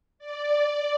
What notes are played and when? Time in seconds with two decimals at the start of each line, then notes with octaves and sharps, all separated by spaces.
0.19 D5